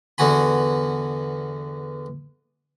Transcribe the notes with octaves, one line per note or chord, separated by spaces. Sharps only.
E2 D3 B3 F#4 G#5 B5